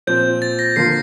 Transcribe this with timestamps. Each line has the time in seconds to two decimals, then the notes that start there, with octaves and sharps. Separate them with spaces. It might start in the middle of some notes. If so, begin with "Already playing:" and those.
0.07 A#2 F3 C4 G6
0.42 A6
0.59 A#6
0.76 D3 F3 A#3 F4 C7